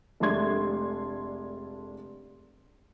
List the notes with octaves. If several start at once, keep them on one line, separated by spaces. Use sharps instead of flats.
F1 G#3 A3 D4 C6 G#6